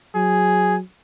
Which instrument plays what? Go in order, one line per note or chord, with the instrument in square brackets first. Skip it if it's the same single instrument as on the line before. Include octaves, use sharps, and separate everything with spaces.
[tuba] F#3 [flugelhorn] G#4